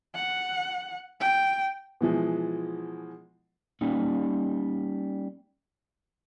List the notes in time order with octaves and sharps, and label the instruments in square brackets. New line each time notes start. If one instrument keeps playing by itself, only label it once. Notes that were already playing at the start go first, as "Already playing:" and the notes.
[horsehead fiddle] F#5
G5
[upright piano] B2 E3 F3 G#3
[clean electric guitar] G3 A#3 C#4 D#4